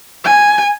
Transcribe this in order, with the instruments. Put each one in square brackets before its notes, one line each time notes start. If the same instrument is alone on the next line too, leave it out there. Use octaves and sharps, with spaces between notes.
[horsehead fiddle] G#5